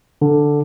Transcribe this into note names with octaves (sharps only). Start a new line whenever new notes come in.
D3